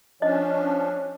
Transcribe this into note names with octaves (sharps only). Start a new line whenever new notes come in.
F3 C#4 D4 C#5 D#5